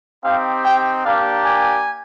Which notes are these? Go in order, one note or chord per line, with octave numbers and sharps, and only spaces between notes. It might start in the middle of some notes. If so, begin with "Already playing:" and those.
C4 D#4 G4 F5
G5
A#3 D4 G4 F5
G#5